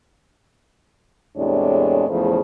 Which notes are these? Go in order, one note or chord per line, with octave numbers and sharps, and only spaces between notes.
E2 A2 C3 G#3 D4 C#5
E2 A2 C#3 F3 A3 C5